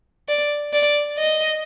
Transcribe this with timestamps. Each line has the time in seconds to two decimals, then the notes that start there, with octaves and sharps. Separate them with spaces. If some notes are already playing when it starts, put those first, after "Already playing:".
0.28 D5
0.73 D5
1.18 D#5